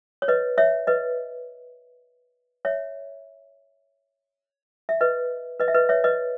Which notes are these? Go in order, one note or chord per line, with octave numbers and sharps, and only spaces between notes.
C#5
B4 D#5
C#5 E5
B4 D#5
C#5 E5
E5
B4 D#5
B4 D#5
E5
B4 D#5
C#5 E5
B4 D#5